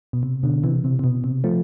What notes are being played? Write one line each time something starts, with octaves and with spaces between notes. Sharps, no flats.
B2
C3
B2 D3
C3 E3
C3
C3
B2
C3
F3 A3